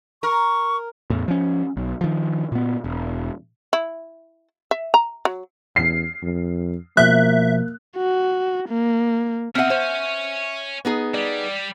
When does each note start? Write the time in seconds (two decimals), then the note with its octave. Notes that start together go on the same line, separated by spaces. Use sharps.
0.23 A#4 C#6
1.10 E2 A2
1.28 F3 C#4
1.77 B1
2.01 D#3 F3
2.52 A#2 B3
2.84 E1
3.73 E4
4.71 E5
4.94 A#5
5.25 F#3
5.76 E2 C7
6.23 F2
6.97 B2 F3 A#3 E5 F#6
7.96 F#4
8.69 A#3
9.55 C#3 C4 D#5 E5 F#5 F6
9.70 C5 C#5 G#5
10.85 B3 D#4 G#4
11.14 G3 D5